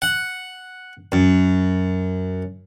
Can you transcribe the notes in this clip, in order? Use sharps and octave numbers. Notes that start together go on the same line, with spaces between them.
F#5
F#2